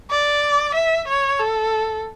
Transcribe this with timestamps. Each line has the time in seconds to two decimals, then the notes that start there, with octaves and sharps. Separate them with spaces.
0.11 D5
0.75 E5
1.08 C#5
1.39 A4